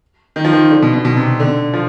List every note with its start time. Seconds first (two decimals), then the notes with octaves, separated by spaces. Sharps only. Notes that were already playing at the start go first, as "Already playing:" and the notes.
0.36 D#3
0.45 F3
0.53 D#3
0.71 D3
0.82 B2
0.93 B2
1.05 B2
1.17 C3
1.40 D3
1.74 F3